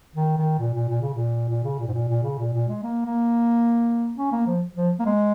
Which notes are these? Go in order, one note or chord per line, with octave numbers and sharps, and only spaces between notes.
D#3
D#3
A#2
A#2
A#2
C#3
A#2
A#2
C#3
A#2
G#2
A#2
A#2
C#3
A#2
A#2
G#3
A#3
A#3
C#4
A#3
F3
F3
A#3
G#3